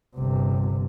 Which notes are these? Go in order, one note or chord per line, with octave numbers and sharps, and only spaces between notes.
G1 C3